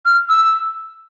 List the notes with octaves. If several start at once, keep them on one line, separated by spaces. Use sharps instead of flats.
F6
E6